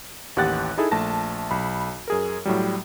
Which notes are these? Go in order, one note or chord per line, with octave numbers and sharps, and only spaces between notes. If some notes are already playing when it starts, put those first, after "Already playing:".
A1 D#2 G4 F#5 F#6 A6
D#4 E4 G#4 A4
A#1 A3 A5 A#6
B1 B5
F#2 G#4 A#4
A2 F#3 G3